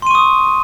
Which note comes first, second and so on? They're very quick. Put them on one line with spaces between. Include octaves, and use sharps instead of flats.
C6 D#7 C#6 D#6